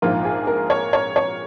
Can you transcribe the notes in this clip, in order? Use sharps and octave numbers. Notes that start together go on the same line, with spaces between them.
A#1 G#2 F3 A#3 F4
G#4
A#4
C#5
C#5
C#5